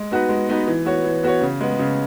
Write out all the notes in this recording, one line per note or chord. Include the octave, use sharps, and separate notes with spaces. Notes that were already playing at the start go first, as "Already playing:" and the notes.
Already playing: G#3
B3 D#4 F#4 B4
G#3
B3 D#4 F#4 B4
E3
B3 F#4 C#5
E3
B3 F#4 C#5
C#3
G#3 B3
C#3